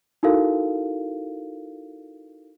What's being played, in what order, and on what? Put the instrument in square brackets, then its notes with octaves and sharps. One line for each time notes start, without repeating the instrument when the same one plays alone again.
[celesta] D#4 E4 F#4 A4 A#4 F5